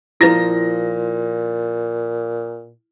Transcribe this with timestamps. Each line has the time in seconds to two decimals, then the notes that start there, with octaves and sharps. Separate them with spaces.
0.21 A#2 F3 E4 B4 A#6